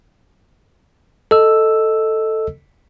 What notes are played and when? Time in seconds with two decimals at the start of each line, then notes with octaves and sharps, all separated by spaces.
1.31 A4 D#5 E6